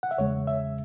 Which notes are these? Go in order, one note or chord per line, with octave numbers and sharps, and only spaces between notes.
F#5
E5
E2 C#3 G#3 C#5
E5